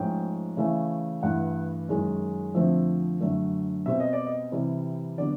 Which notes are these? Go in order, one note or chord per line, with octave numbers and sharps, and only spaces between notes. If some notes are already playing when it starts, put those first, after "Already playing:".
Already playing: G#2 F3 A3 C#4 G5
C#3 E3 A3 C#4
G2 E3 A3 F#5
F#2 D#3 G#3 C#4
F2 D3 F3 A3 C4 E5
F#2 D3 F#3 A3
B2 G3 C4 E5
D#5
D5
D#5
C3 E3 G3
D3 F#3 B3 D5